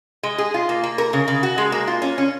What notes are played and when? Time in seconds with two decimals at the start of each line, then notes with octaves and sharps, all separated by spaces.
0.23 G#3
0.38 G#4
0.54 F4
0.69 A#3
0.83 A#3
0.98 A#4
1.13 C#3
1.28 C#3
1.43 F#4
1.58 G#3
1.72 A#3
1.87 F4
2.02 C#4
2.18 C#4